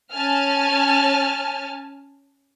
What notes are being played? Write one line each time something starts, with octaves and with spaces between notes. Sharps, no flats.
C#4 G#5 A5 F6